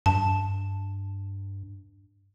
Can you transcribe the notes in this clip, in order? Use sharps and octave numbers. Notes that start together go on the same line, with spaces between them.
G2 A5